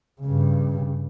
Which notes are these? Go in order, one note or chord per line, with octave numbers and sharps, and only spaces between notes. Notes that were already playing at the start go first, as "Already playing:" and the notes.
G2 C#3